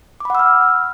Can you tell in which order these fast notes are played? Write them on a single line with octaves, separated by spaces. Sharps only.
D6 B5 F#5 E6 F6